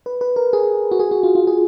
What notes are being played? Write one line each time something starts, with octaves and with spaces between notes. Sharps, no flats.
B4
B4
A#4
G#4
F#4
G#4
F#4
F4
F4
G#4